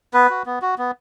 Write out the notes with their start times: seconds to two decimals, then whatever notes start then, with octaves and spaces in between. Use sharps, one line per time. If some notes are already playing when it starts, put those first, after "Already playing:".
0.14 B3 B4
0.30 F#4
0.46 B3
0.62 F#4
0.78 B3